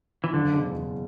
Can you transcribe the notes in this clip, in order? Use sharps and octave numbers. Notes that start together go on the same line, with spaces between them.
E3
F#1 D3
E2 B2 G#3
F#1